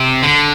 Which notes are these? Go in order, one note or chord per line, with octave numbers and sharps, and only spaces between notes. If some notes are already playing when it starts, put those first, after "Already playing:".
Already playing: C3
D3